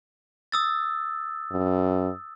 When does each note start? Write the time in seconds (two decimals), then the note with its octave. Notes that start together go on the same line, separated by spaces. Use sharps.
0.52 D#6 E6 A6
1.52 F#2